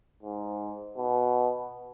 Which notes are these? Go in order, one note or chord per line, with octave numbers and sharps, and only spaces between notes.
G#2
B2